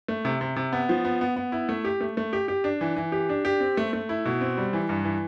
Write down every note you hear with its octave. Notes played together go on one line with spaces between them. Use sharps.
A3
C3
C3
C3
B3
F3
B3
B3
B3
E4
A3
G4
A3
A3
G4
G4
D4
E3
E3
G4
D4
G4
C4
A3
A3
E4
B2
C4
G3
E3
G2
E3